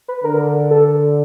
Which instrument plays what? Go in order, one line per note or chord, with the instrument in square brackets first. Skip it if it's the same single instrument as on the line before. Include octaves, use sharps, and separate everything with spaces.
[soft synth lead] B4
[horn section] D3 [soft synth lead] A#4
[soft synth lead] A4